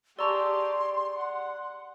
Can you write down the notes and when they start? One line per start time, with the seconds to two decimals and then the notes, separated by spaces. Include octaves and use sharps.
0.19 G4 G#4 D5 A5 A#5 C6 C#6 E6
1.17 F#5